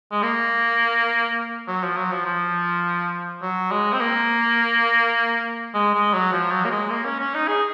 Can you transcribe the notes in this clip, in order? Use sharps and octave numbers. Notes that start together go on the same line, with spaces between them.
G#3
A#3
F#3
F3
F#3
F3
F3
F#3
G#3
C4
A#3
G#3
G#3
F#3
F3
F#3
A#3
G#3
A#3
C#4
C#4
D#4
G#4